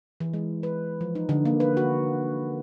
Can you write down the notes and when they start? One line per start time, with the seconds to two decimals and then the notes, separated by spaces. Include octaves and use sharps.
0.20 E3
0.33 G#3
0.63 B4
1.01 F3
1.15 D#4
1.29 D3
1.45 A#3
1.60 B4
1.77 F#4